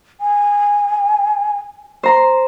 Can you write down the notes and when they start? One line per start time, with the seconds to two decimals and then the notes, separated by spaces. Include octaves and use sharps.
0.21 G#5
2.03 C5 A#5 C6